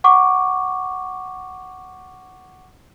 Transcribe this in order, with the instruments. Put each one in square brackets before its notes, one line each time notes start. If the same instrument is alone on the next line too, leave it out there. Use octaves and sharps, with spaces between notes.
[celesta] F#5 C#6 D6